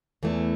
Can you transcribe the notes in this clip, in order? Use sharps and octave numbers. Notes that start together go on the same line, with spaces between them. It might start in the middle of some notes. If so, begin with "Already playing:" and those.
E2 E3 A3